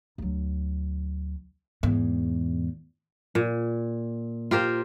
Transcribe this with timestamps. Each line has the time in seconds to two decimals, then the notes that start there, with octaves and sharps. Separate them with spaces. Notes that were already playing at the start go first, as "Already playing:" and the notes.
0.18 D2 F#3
1.83 E2 G#2
3.35 A#2
4.51 F4 G4 A#4 C5